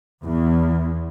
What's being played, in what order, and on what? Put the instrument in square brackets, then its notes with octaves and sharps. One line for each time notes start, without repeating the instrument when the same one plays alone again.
[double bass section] E2